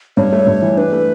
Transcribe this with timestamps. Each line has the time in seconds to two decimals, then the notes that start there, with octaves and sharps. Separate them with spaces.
0.17 G2 C#5
0.32 A3
0.47 G2
0.62 E3
0.77 D4 B4
0.92 A3